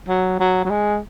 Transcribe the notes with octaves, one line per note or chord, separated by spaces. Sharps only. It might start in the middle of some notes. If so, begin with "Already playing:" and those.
F#3
F#3
F#3
G#3